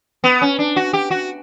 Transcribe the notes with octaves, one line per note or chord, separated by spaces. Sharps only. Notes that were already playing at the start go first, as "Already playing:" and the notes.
B3
C#4
D4
F#4
G4
F#4